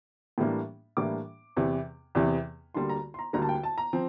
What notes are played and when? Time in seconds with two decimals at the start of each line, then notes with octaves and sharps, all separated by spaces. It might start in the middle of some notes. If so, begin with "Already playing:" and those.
0.38 A2 E3 G3 A#3 D4
0.97 A2 E3 G3 A#3 D4 D6
1.57 E2 C3 E3
2.15 E2 C3 E3
2.74 D2 D3 G3 A#3 C6
2.89 A#5
3.14 C6
3.19 A#5
3.33 D2 D3 G3 A#3 A#5
3.42 A5
3.49 G5
3.63 A5
3.78 A#5
3.93 F3 C4